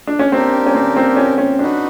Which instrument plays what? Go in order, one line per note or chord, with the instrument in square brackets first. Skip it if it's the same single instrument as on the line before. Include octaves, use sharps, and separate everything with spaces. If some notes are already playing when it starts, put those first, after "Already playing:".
[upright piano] D4
C#4
[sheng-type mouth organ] A#3 D4 G4 A#4 [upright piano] C4
[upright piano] C#4
C4
C4
C#4
C#4
[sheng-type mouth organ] C4 D#4 F#4 B4 [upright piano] D4